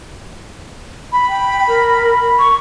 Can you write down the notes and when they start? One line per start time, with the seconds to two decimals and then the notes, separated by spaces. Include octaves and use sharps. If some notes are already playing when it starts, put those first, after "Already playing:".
1.13 B5
1.28 G5
1.68 A#4
2.39 C#6